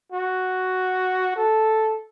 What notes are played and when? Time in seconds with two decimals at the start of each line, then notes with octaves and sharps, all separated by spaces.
0.12 F#4
1.36 A4